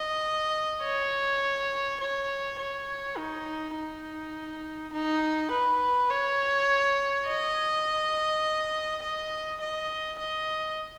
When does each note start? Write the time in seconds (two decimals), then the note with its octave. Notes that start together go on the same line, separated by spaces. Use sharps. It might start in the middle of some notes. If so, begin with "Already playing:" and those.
Already playing: D#5
0.84 C#5
2.01 C#5
2.60 C#5
3.17 D#4
3.76 D#4
4.93 D#4
5.52 B4
6.10 C#5
7.27 D#5
9.03 D#5
9.61 D#5
10.19 D#5